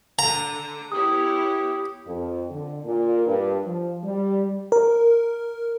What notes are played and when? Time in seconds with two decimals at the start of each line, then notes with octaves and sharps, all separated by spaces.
0.19 D3 A#5
0.92 B3 E4 G4 C#5 D#6
2.06 F2
2.50 D3
2.85 A#2
3.26 G2
3.66 F3
4.03 G3
4.72 A#4